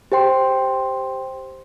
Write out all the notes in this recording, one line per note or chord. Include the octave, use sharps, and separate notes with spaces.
G4 C5 G5 C6